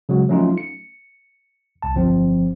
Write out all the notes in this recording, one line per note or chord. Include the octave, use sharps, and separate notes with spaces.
C#3 F#3 G#3 F#4
F3 F#3 A3 C#4 D#4 F4
C#7
C2 A5
G1 F3 C4